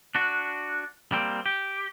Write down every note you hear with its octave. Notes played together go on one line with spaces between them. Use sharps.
D4 F#4
G3 A#3 C4
G4